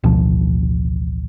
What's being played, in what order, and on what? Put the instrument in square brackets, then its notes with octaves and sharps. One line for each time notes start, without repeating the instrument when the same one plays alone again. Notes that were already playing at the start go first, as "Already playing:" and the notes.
[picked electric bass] A1 D2 B2 F3